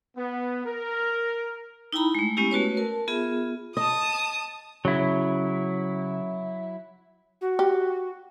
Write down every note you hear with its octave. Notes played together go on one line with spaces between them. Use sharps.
B3
A#4
D#4 E4 G5 A#5 B5
G#3 A3
G#3 B3 C#4 E4 G4
A3 F#4 B4 C#5
A#4 A5
B3 F4 G#4 E5
D#5 A5 D#6
C#3 F#3 E4
F#4
G4